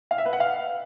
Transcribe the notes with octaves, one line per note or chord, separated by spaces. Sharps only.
F5
E5
B4
F#5
F5